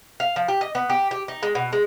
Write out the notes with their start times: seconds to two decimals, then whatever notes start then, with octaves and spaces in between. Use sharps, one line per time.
0.20 F5
0.36 F3
0.48 G4
0.61 D#5
0.75 B3
0.90 G4
1.11 G4
1.28 D#4
1.43 G#3
1.55 B2
1.73 G#3